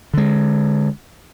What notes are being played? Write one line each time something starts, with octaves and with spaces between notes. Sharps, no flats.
D3 G#3